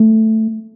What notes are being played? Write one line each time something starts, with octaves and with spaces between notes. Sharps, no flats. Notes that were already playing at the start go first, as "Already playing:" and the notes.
Already playing: A3